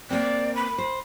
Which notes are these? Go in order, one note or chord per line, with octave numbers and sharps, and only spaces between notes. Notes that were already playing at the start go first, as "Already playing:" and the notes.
A#3 C4 D5
B5
C5